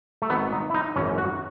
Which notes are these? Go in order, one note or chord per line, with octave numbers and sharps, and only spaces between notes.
A3
G#1 G#2 D#3 B3
D#4
E4
D#4
G#1 F#2 E3 C#4
F#4